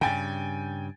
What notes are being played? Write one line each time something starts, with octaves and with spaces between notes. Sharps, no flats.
G2 C#3 G5 G#5 A6